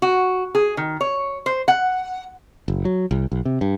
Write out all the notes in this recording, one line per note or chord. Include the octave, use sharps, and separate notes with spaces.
F#4
G#4
D#3
C#5
C5
F#5
F#1
F#3
C2
B1
C3
G2